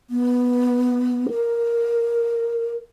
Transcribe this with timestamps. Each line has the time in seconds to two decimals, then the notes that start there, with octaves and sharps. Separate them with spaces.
0.10 B3
1.30 A#4